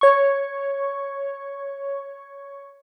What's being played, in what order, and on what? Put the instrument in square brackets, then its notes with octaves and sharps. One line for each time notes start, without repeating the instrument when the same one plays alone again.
[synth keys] C#5 C#6